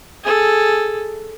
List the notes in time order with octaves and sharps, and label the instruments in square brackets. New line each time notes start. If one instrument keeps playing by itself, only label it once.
[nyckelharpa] G#4 A4